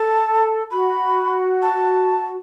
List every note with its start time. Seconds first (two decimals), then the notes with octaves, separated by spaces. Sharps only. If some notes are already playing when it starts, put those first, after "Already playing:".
Already playing: A4 A5
0.71 F#4 B5
1.62 A5